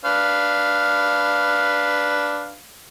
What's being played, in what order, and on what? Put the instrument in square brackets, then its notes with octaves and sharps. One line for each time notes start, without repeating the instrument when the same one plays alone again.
[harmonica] D4 B4 F5